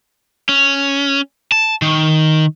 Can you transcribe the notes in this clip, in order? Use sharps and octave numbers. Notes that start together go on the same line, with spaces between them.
C#4
A5
D#3